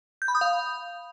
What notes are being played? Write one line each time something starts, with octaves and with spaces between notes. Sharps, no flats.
G6
B5
D#6
F5